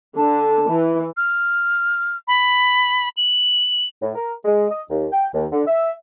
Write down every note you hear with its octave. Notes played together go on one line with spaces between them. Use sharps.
D3 A5
E3
F6
B5
F#7
A2
A#4
G#3
D#5
D#2
G5
D#2
D3
E5